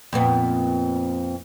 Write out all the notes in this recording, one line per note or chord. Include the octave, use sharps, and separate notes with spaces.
F2 A#2 B3